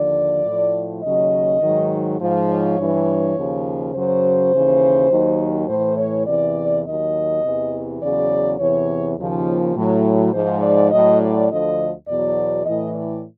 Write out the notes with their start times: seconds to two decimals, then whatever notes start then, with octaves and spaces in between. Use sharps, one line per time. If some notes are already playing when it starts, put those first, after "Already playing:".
Already playing: D#2 D3 F3 D5
0.46 A2 F3
1.04 D#2 C#3 F#3 D#5
1.62 G#2 D#3 F#3
2.21 G#2 F3
2.49 C#5
2.78 G2 E3
3.36 D#2 C#3 F3
3.94 F#2 C#3 F#3 C5
4.53 D#2 C#3 E3
5.11 D#2 D#3 F#3
5.69 A2 E3 C5
5.98 C#5
6.27 E2 C3 E3 D5
6.85 D#2 D#3 F#3 D#5
7.43 E2 C3 E3
8.01 E2 C#3 F#3 D5
8.59 E2 C3 E3 C#5
9.18 D#2 C#3 F3
9.76 A2 F#3
10.34 G#2 F3 C5
10.62 D5
10.91 A2 F#3 D#5
11.21 D5
11.50 D2 D3 F3 D#5
12.08 E2 B2 F#3 D5
12.66 A2 E3 D#5
12.95 D5